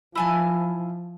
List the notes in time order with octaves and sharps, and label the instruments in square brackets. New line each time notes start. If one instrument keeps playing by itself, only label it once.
[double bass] F3 [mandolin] E4 G#5 A5